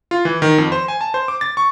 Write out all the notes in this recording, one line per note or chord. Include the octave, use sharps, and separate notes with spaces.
F4
E3
D#3
F2
C5
G#5
A5
C5
D6
A6
C#6